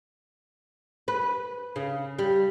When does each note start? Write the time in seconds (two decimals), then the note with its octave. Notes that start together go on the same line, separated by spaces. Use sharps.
1.08 B4
1.76 C#3
2.19 G3